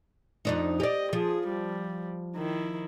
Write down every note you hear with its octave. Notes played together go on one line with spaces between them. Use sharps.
F2 D4 D#4
G4 D5 D#5
F3 G#4
G3
D#3 E4